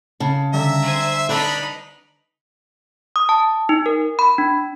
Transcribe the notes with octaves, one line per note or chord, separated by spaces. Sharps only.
C#3 A5
D3 G3 E5 A#5
C5 G#5
D4 D#4 B4 B5
D#6
A5
D#4
A#4
B5
D4